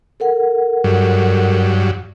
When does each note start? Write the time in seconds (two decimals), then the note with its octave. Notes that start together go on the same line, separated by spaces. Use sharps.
0.20 A4 A#4 F#5
0.84 G2 F#3